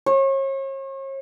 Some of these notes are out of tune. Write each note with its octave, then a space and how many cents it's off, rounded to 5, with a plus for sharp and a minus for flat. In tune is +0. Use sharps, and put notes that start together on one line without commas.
C#5 -40